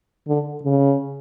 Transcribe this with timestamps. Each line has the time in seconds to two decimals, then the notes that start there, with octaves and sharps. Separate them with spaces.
0.28 D3
0.63 C#3